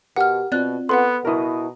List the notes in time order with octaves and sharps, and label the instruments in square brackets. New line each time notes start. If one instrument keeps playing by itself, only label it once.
[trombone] B2 [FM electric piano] G4 A#4 [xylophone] F#5 F6
[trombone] B2 [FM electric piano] C4 F4 [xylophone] D5 F#6
[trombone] B3 [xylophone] A4 B4 F#5 [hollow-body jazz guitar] C6
[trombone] B2 [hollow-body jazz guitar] E4 A#4 [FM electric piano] A#5 D#6